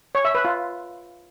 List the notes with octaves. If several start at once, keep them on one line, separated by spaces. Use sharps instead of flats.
C#5
E5
B4
F4